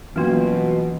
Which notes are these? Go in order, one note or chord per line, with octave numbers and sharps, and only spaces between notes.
F#2 B2 E3 G3 A#3 B3 F4 C6